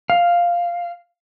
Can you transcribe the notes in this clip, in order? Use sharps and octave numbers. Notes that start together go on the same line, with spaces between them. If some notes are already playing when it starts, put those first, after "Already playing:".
F5